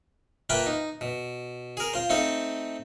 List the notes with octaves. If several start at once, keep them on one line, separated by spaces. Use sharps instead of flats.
A#3 F4 B4 E5 G5 A5
D#4
B2
G#4 A#4
F4 C5
A3 C4 D#4 A4